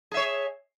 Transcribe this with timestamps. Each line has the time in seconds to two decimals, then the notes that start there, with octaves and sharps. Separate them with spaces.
0.12 G#4
0.14 E5
0.17 C#5